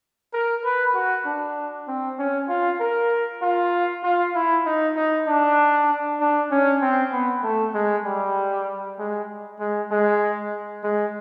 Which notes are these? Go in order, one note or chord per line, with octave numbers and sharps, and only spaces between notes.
A#4
B4
F#4
D4
C4
C#4
F4
A#4
F4
F4
E4
D#4
D#4
D4
D4
C#4
C4
B3
A3
G#3
G3
G#3
G#3
G#3
G#3